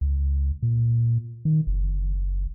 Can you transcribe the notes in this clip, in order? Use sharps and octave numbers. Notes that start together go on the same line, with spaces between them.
C#2
A#2
D#3
F#1